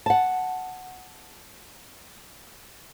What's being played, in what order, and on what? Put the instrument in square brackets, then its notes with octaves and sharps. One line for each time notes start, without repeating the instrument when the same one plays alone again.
[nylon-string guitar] F#5 A5